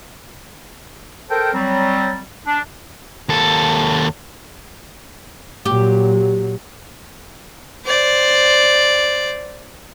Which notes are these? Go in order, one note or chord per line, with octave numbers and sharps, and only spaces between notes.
A4 A#4 C5 G5
F#3 G3 C4
D4
D#2 A4
A#2 F#3 G4
C5 D5